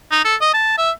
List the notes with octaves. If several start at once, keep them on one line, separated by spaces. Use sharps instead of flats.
D#4
A4
D#5
A5
E5